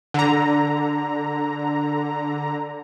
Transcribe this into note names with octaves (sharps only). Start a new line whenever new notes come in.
D3 A#5